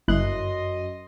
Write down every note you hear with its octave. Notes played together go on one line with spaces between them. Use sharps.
G1 F#2 E4 D#5 C6 F#6